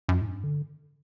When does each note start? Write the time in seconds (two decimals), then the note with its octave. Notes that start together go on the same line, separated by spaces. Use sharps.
0.09 F#2
0.21 A2
0.26 G2
0.44 D3